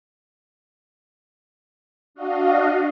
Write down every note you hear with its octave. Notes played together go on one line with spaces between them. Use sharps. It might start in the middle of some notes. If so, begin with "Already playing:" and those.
D4 F#4 D#5 F5